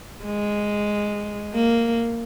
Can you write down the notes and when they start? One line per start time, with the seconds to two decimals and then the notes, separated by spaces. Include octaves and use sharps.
0.25 G#3
1.54 A#3